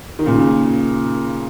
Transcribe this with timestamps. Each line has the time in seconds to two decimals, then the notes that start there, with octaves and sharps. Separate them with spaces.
0.19 D#3
0.26 A#2 C#3